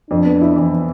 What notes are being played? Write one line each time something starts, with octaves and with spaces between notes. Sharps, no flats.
F2 D4
B3
E4
E3